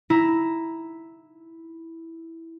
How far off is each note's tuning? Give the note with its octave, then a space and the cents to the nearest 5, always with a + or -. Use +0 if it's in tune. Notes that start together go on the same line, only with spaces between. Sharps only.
E4 -5 A#5 +5